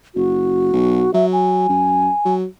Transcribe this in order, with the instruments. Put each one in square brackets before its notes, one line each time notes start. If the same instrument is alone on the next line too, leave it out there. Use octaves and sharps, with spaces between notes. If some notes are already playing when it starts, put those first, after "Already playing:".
[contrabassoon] F#1 [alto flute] F#4
[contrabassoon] B1
[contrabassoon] F#3 [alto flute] E5
[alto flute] G#5
[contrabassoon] F#2
F#3